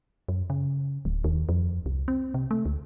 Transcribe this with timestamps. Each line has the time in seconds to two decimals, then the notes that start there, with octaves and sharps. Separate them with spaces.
0.28 F#2
0.50 C#3
1.05 D1
1.24 D#2
1.49 F2
1.86 C2
2.08 C4
2.34 C3
2.51 A3
2.66 D2